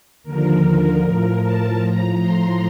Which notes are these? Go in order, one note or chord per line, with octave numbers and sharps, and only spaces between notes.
D#2 D3 F3 A#4
A2 F3 A#4
A5
A2 F3 A#5
C6